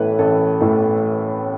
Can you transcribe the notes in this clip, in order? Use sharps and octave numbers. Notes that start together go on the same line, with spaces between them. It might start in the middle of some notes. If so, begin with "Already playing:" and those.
Already playing: A1 A2 E3 A3 A4 B4 C#5
A1 A4
A2 E3 A3